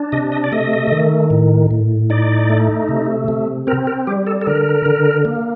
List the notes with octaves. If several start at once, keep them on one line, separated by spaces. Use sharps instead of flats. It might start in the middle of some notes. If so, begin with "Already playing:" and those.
Already playing: D4
C3 D#5
D#5
D5
A3 D#5
D#3
A2
A2
D#4 D5
A3
C3
C3
C4 A#4
A#4
G3 G4
A4
A4
D3 A#4
D3
A#3